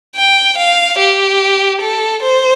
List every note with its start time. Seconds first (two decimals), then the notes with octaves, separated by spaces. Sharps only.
0.16 G5
0.58 F5
0.98 G4
1.81 A4
2.22 C5